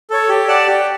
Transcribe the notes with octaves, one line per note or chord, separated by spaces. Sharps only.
A4 C#5
G4
D5 F#5 A5
G4